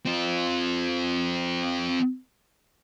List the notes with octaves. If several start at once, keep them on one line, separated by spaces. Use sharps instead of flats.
C4 F4